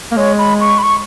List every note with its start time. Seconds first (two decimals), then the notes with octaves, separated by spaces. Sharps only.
0.11 A#3
0.16 G#3 C#5
0.38 B5
0.61 C#6
0.78 B5
0.83 C#6